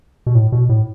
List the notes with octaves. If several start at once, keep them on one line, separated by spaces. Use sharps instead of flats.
B2
A2
B2
A2